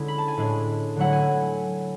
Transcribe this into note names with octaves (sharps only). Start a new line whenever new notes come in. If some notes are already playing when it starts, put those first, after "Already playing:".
Already playing: D3 G#3 C#4 E4
B5
A5
G#5
A2 G#3 D4
D3 F#3 A3 E4 F#5
G#5